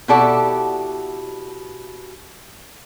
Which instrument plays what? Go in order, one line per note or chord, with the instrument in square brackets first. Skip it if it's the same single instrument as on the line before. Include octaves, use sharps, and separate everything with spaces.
[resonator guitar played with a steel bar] B2 E4 G4 A4 D5 F#5